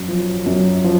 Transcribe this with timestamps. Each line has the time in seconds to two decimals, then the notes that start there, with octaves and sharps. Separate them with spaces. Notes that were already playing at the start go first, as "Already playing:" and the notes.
Already playing: F#2
0.08 F3
0.46 F#2
0.84 F3